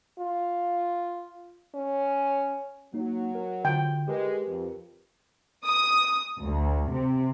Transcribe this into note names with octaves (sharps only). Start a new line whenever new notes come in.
F4
C#4
F#3 A#3 D#4
A#4
D3 F4 G5
G#3 G4 A#4 B4
F2
D#6
D2
C3